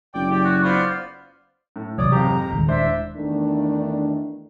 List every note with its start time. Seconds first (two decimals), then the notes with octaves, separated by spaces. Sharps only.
0.14 F#1 D5 G5
0.31 G4 D5
0.45 F#4
0.64 B3 F4 C5 D5
1.76 A2
1.98 C3 E3 F#3 C#5 D5 D6 D#6
2.12 F2 G#2 G4 A#5
2.53 D#1 D#3 G#3
2.68 D4 E4 C5 E5
3.15 E2 D#3 A3 D4